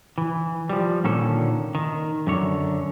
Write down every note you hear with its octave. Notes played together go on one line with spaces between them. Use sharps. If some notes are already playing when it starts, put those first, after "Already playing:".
E3
F3 G3
A#2 D3 D#3 C#4 A4
D#3
F#2 D3 C#5